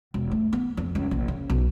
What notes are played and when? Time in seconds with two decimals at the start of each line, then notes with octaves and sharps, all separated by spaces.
0.14 E1
0.31 A3
0.53 B3
0.77 F2
0.95 C#2
1.11 A#1
1.28 C#3
1.50 B1